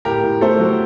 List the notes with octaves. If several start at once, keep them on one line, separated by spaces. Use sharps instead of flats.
A2 G4 A#4
A2
A3 A4 C5
F#3